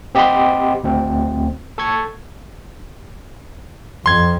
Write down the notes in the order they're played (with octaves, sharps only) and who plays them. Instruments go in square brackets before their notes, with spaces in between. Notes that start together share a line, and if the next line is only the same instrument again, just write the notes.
[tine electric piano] C4 G4 D#5 F#5 B5 C6
D2 C4
A4 C#6 G#6
[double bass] F2 [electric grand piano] C6 G#6